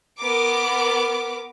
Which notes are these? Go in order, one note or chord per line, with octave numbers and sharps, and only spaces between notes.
B3 A#4 D6